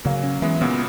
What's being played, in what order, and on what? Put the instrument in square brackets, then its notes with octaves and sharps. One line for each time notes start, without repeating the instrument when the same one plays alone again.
[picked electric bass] C#3 [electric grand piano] F#3 A#3
[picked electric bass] C#4
[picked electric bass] E3 [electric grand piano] G#3 B3
[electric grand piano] A#2 C#3 [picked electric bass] B3